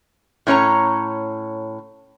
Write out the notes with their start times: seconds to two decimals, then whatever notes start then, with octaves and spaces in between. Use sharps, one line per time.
0.47 A2 C#4 C#5 A#5